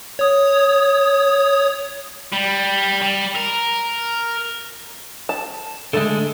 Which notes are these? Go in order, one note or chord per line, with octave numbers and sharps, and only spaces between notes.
C#5 D#6
G3
G3
A#4
A5
D3 G#3 A3 A4